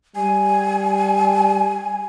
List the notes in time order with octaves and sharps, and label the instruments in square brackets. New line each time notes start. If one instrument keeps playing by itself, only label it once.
[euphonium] G3 [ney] G#5